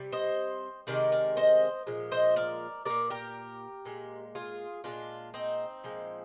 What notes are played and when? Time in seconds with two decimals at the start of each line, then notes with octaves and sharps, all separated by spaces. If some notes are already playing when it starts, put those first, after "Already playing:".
Already playing: C3 G3
0.12 C5 D#5
0.87 C3 D#3 G#3 A#4 D5
1.12 A#4 D5
1.37 C5 D#5
1.87 A#2 F3 G#3
2.12 C5 D#5
2.36 A#4 D5
2.85 A#2 G3 A#4 D5
3.10 G4 A#4
3.85 A#2 G#3
4.35 F4 G#4
4.84 A#2 G#3 D4 F4
5.34 C4 D#4
5.84 A#2 F3 G#3